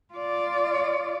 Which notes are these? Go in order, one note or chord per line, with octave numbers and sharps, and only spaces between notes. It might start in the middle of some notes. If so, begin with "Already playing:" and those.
F4 D5